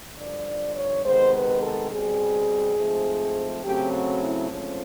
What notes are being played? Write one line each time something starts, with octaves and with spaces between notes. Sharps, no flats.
G2 D3 F3 D5
D5
C#5
C3 D#3 G#3 B3 C5
B4
A4
B2 G3 C4 G#4
G#2 F3 A3 C4
C#3 F#3 A3 C4 G4
F#4
E4
G#2 F3 A3 C4 C#4